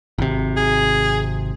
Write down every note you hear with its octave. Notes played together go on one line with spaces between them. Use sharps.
G#1 C3
G#4